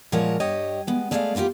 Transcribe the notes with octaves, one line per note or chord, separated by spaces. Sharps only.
A#2 F3 G#3 F#4 A#4 C#5
G2 G4 C#5 D#5
G#3 B3
G#3 A3 G#4 D5 E5 F5
A#3 B3 C#4 F4 G4